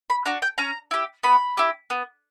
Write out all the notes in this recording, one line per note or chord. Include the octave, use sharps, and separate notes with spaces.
B5
D4 F#4 A#5
G5
C#4 A#5
E4 G4
B3 B5
E4 G4
B3